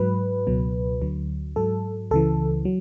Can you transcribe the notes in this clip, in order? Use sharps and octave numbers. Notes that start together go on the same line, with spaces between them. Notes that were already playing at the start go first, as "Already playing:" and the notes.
Already playing: G#2 F#3 B4
C#2 B2 F#3
D2 D3 F#3
G#2 F#3 A4
C#2 C#3 E3 A4
F#3